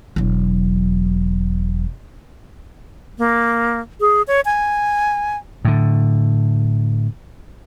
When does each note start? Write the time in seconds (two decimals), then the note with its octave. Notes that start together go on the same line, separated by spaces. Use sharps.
0.16 E1 F#3
3.18 A#3
4.00 G#4
4.28 C#5
4.45 G#5
5.65 A2 D3